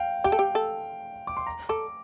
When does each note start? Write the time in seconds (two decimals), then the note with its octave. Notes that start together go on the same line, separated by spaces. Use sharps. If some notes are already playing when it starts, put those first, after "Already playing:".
Already playing: F5 G5
0.24 G4 G5
0.32 A4
0.39 G4
0.55 A4
1.27 D6
1.37 C6
1.46 A#5
1.69 A4 D6